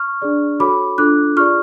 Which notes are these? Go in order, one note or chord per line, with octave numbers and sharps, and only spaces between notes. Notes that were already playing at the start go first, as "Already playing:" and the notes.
Already playing: C#6 F6
D4 G#4 D5
F#4 A4 C#5 B5 D6
D4 F4 A4 D6 F#6
F4 G#4 D5 C#6 F6